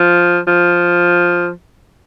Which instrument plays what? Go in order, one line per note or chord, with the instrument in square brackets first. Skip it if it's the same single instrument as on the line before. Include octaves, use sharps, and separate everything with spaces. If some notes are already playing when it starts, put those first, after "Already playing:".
Already playing: [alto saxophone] F3
F3